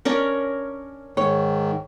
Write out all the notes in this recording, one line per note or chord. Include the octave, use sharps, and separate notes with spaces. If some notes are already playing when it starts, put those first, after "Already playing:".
C#4 D4 A#4
G#2 D#3 C#5